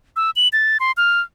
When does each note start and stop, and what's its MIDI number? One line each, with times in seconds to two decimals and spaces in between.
0.16 0.30 88
0.36 0.48 102
0.53 0.78 93
0.80 0.92 84
0.97 1.21 89